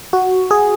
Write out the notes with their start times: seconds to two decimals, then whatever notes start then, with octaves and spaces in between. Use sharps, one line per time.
0.13 F#4
0.51 G#4